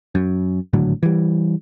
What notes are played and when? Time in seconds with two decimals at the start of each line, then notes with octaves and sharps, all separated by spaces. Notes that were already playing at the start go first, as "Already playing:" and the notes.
0.15 F#2
0.73 G#1 A2 D3 F#3
1.03 E3 G3